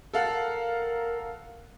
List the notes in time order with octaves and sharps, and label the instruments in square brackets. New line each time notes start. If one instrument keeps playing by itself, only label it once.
[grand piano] A4 F5 F#5 [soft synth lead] A#4